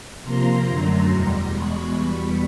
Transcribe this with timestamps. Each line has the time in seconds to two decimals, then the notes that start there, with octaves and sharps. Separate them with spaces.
0.24 C3 F3 A#3 A#5 C6
0.66 F#2 D3 F#3 A3
1.09 E2 B2 G3
1.51 E2 B2 G#3 B5 C#6
1.93 E2 B2 G3